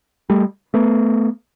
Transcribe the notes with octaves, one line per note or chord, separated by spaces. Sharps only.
G3 A3
A3 B3